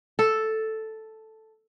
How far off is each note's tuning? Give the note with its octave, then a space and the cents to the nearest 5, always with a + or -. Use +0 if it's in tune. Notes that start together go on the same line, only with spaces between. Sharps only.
A4 +0